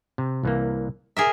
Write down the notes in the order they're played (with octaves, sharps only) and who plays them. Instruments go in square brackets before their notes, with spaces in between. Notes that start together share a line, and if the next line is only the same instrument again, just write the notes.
[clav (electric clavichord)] C3
C2 E3 A#3
[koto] G#4 A#4 E5 [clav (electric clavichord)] A#5